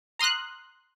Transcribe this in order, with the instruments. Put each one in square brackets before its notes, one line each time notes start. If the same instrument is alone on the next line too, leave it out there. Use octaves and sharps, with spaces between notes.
[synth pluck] A#5 C6 D#6 F6 F#6